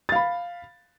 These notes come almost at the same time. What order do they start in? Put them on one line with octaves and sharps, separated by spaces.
A6 F5 B5